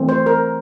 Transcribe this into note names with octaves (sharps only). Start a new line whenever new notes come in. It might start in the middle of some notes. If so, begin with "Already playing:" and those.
Already playing: E3 A3 C4
C5
A#4